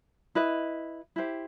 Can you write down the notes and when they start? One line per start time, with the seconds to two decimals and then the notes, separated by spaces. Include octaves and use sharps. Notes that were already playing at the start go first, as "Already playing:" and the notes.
0.35 E4 B4 D#5
1.16 E4 G4 C5